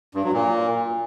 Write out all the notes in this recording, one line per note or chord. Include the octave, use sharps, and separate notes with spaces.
G2
F#3
A#2